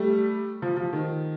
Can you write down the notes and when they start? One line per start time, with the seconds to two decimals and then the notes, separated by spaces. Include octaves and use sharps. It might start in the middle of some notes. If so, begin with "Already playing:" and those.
Already playing: G3 A3
0.62 F3
0.77 F3
0.93 D#3